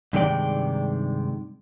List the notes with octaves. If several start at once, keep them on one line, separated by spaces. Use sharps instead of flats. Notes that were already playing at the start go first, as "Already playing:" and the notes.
G2 C3 D#3 G#3 D5 G5